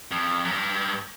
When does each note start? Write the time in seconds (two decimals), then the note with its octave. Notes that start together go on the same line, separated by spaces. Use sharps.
0.11 F2
0.45 F#2
0.51 G2